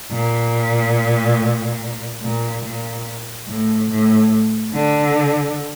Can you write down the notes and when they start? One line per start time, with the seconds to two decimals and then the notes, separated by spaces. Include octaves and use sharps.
0.12 A#2
2.23 A#2
2.65 A#2
3.48 A2
3.90 A2
4.74 D3